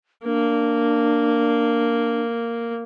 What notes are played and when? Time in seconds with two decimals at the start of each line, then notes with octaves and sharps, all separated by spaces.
0.24 A#3 D4